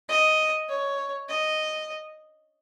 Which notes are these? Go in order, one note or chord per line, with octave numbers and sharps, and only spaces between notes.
D#5
C#5
D#5